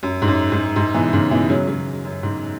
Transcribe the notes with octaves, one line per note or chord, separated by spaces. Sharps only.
F#2
G#2
F#2
G#2
G#2
B2 E3
G#2 C#3
B2 E3
C#3 F#3
C#3 F#3
F#2
G#2